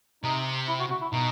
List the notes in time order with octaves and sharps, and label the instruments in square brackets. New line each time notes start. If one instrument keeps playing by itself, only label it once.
[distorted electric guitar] C3 [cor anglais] D#4
[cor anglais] E4
F#4
F#4
E4
[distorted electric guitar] B2 [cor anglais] D#4